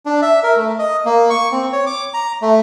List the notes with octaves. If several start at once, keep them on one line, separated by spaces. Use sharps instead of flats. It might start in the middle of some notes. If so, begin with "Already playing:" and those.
D4
E5
A#4
A3
D#5
A#3
C#6
C4
C#5
D6
A#5
A3